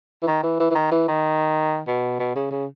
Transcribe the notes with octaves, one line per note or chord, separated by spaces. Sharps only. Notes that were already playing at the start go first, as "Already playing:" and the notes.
E3
D#3
E3
E3
E3
D#3
E3
D#3
B2
B2
C#3
C#3